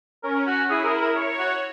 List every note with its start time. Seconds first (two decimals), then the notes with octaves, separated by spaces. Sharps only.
0.23 C#4 A#4
0.47 F#4
0.70 E4 G#4
0.84 A#4
1.01 A#4
1.15 C#5
1.39 F#4